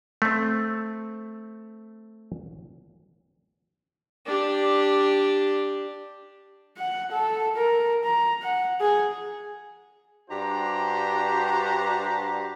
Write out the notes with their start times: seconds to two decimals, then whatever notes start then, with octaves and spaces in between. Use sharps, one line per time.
0.22 A3 C4
4.26 D4 G4
6.77 F#5
7.11 A4
7.56 A#4
8.04 A#5
8.42 F#5
8.80 G#4
10.30 G2 D4 F#4 G4 C5 A#5